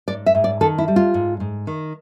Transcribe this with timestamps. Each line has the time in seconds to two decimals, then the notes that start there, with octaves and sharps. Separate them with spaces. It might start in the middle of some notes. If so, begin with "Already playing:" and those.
0.08 G#2 D5
0.26 E5
0.35 G#2
0.44 D5
0.61 D#3 A4
0.78 E4
0.88 G3
0.96 F4
1.14 G#2
1.40 G#2
1.67 D#3